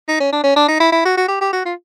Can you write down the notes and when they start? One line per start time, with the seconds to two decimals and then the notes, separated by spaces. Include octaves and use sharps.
0.08 D#4
0.20 C#4
0.33 D4
0.44 C#4
0.56 D4
0.68 D#4
0.80 E4
0.92 E4
1.05 F#4
1.17 F#4
1.28 G4
1.41 G4
1.53 F#4
1.65 F4